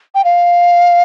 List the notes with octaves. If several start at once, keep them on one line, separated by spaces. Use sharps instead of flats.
G5
F5